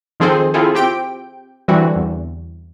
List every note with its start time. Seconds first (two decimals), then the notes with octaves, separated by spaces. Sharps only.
0.20 D#3 F3 C4 G#4 A4 C5
0.54 C4 E4 F4 G#4 A4
0.75 C4 G4 G5 D7
1.68 D3 E3 G3 C4 F#4
1.96 E2